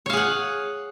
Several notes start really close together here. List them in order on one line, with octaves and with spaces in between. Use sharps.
C#5 F5 G#4 F#5